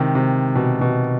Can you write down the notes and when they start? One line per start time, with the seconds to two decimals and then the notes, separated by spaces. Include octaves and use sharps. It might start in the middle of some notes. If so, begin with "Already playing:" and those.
Already playing: C3 D#3
0.15 C3
0.56 B2
0.81 B2